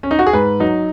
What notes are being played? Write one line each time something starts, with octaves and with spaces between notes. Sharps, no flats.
C#4
D#4
F#4
G#4
G#2 B4
F#3 D#4